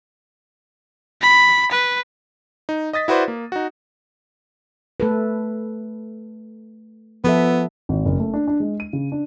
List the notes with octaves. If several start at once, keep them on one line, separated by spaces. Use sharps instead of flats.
B5
B4
D#4
D#5 D#6 A6 B6
E4 F#4 B4 C5 D5
A#3
D#4 F#4
A3 A4 B4
F3 B3 A4 E5
G#1
F#1
A3
D4
D4
G#3
D#7
C#3
D4